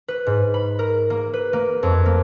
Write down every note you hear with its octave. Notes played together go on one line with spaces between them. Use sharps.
B4
G#2
B5
A#4
A#3
B4
A#3
F2
A#3